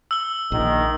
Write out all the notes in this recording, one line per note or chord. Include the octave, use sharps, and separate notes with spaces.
E6 G7
A#1 D#3